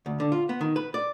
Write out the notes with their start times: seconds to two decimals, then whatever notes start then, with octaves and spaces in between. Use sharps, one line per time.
0.06 D2
0.20 D3
0.32 F4
0.49 B3
0.61 D#3
0.76 B4
0.94 D5